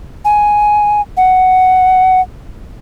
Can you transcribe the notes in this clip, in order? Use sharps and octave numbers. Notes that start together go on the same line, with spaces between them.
G#5
F#5